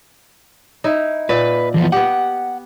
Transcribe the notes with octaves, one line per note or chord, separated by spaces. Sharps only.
D#4 E4
A#2 B4
E3 F3 B3
B3 G4 F#5